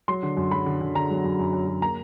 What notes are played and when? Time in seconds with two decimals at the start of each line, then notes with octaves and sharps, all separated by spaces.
0.08 F#3 C6
0.23 D3
0.37 F#2
0.51 F#3 B5
0.66 D3
0.81 D3
0.95 D3 A#5
1.10 F#3
1.24 F#2
1.39 F#2
1.53 F#2
1.67 F#2
1.82 A#3 A#5